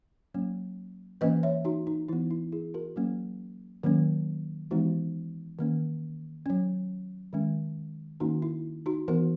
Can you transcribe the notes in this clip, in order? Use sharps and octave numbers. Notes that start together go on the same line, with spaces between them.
F#3 A#3 C#4
E3 A#3 C#4 B4 D#5
C#5 E5
D#4 F#4
D#4
E3 B3 E4
E4
E4 G#4
F#4 A#4
F#3 A#3 C#4
D#3 F#3 A#3 C#4
E3 G#3 B3 D#4 F#4
D#3 A#3 C#4
F#3 C#4
D#3 G#3 C#4
D#3 A#3 C#4 D#4 F#4
E4
D#4 F#4
E3 B3 F#4 A#4